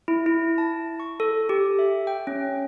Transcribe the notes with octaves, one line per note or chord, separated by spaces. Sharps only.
E4
E4
A5
C#6
A4
G4
E5
G5
C#4